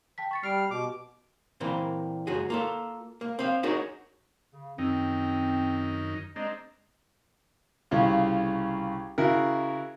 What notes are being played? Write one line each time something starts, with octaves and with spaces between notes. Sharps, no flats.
G5 A5 B6
C#6 A6 C#7
G3 F6 C7 D7
B2 G4 D6
A#2 E3 A#3 C4
C#2 F#2 F#4 G#4
A#3 F4 A4
A#3
C4 F5
D4 D#4 F#4 G#4 A#4 C#5
C#3
F#2 D#3 C4 D#4
G#3 C4 D4 D#5 A#5
C2 C#3 C#4 F4
C#3 E4 F#4 A#4